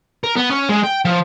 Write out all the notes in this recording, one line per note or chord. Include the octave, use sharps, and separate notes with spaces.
A#4
B3
C#4
G#3
G5
F3